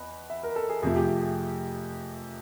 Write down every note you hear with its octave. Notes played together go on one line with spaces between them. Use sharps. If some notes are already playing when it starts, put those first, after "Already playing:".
Already playing: E2 B4 D#5
E5
A#4
A4
G#4
F2 C3 F3 A3 G#4
G4
G4
G#4